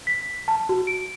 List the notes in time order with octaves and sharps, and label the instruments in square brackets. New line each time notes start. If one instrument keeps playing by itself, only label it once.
[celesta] B6
A5
F#4
D7